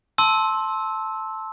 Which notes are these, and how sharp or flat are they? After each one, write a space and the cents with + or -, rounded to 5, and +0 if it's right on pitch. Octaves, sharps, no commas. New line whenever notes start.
A5 +0 C6 +10 E6 -15